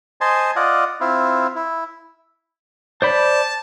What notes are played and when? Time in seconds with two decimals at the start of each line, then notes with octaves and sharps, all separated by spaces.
0.21 C5 D#5 G#5 A5 C6
0.56 F4 D5 D#5 F#5
1.01 C4 E4 F4
1.56 E4
3.02 C5 D5 A5 B5